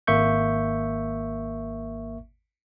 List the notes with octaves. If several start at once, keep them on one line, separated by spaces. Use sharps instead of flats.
G#1 A#3 E5 C#6 G6